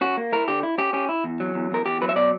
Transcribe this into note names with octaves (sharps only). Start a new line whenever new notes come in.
C#4 F#4
A#3
E4 A#4
D3 G4
E4
C#4 G4
C#4 G4
E4
E2
F#3
E2
E2 A#4
E2 G4
F#3 B4
E5
B2 D5